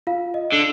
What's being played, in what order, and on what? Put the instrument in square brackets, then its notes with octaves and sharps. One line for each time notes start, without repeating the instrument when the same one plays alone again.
[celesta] F4 F5
D#5
[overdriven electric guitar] D3